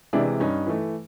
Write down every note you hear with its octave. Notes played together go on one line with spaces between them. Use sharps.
C3 E3 G#3 D4 E4
G2 C#4 D#4
E3 A3